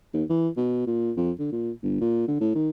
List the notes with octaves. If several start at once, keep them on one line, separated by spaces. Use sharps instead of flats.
D#2
E3
B2
A#2
F2
D3
A#2
G1
A#2
D3
A2
D#3